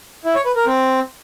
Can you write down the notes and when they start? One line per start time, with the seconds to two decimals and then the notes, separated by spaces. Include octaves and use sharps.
0.25 E4
0.35 C#5
0.45 B4
0.56 A#4
0.66 C4